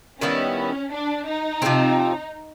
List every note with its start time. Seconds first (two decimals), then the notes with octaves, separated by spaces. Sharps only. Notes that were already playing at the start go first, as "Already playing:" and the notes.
0.21 D#3 G3 B3 C#4 E4
0.92 D4
1.27 D#4
1.62 C3 F3 G#3 C4